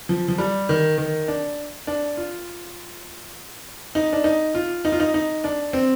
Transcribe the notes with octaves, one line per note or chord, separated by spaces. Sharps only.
F3
F3
G3
D#3
D#3
D4
D4
F4
D#4
D4
D#4
F4
D#4
F4
D#4
D#4
D4
C4